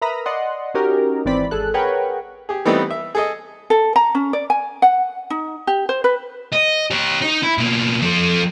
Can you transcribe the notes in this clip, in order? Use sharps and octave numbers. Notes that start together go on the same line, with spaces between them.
A#4 B4 E5 A#5 B5 D#6
D5 D#5 F#5 C6
C#4 D#4 F#4 G4 A#4
G#1 E3 C4 D5 B5
G#1 G#4 A4 F#6
G#4 A#4 B4 C#5 F#5 G5
G4 G#4
E3 G3 A3 B3 C4 D#4
E5
G#4 A4 D#5
A4
A#5
C#4
D5
G#5
F#5
D#4
G4
C5
B4
D#5
G4 C#5
D#4
E4
B2 A#3
F3 A4